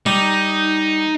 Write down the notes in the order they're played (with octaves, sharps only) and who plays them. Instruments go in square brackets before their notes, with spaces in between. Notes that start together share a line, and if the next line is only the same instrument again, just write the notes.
[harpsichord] G3 [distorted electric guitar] D#4